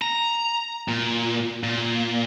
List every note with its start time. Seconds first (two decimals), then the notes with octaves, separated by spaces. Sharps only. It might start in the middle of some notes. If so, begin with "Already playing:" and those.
0.02 A#5
0.88 A#2
1.64 A#2